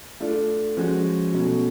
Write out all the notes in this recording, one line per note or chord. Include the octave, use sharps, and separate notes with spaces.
A3 D4 F4 A4
F3 G#3 C#4 F#4
B2 F#3 A3 C#4